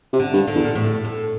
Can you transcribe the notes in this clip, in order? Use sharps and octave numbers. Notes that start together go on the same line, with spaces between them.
C3
D3
G2
D3
E2
A#2
A2
A2